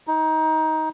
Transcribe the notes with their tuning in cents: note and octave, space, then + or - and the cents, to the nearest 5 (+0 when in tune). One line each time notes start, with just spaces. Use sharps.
D#4 +20